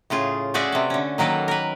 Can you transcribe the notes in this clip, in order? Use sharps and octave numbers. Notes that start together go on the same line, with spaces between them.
A2 C#3 F4 G#4
A3 C#4 F#4 G#4 D5 E5
C3 A4
D3 C#4
D#3 F#3 A#3 A4 B4
A#4 B4